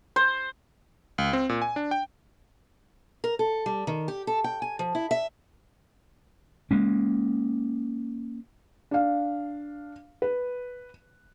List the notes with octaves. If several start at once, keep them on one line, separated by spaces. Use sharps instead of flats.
C5
C#2
C4
A#2
G#5
D4
G5
A#4
A4
G3
D#3
G4
A4
G5
G#5
F3
E4
E5
G#3 A#3 C#4
D4 F5
B4